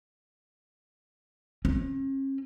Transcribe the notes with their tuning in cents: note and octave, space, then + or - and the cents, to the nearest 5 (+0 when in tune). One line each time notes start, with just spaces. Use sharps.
C#4 -40